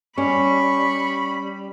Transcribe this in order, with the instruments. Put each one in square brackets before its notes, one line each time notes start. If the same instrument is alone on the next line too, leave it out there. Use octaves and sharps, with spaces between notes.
[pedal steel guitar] G3 [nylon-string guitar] C#4 [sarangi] B5 [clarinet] C#6